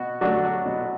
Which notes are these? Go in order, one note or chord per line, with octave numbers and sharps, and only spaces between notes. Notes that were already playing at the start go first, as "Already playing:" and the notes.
Already playing: B2 F#4
F#3 A3 D4 F#4
B2